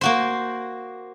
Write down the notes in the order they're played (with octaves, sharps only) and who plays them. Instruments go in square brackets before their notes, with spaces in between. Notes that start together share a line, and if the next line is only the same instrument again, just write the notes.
[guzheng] A#3 F#4 C5